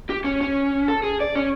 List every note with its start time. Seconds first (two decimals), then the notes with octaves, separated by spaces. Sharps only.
0.10 G4
0.25 C#4
0.41 C#4
0.88 A4
1.03 G#4
1.20 D5
1.35 C#4